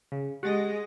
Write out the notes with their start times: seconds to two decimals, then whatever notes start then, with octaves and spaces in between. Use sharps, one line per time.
0.12 C#3
0.43 G#3 G4 D#5 F#5 A6 A#6